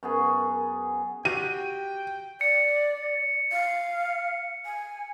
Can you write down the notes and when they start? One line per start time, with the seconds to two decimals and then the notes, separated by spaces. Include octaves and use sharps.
0.03 F#2 B3 G#4
1.25 F#4 G4 G5 D#7
2.41 D5 C#7
3.52 F5
4.65 G#5